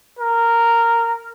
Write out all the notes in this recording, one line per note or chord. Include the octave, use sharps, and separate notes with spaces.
A#4